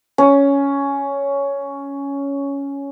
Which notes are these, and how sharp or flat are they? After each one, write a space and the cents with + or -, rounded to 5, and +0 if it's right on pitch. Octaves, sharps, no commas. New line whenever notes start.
C#4 +10